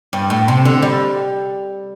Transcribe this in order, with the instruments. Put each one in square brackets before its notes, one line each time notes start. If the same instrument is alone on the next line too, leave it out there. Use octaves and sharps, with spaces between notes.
[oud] G2
A2
C3
D3
G3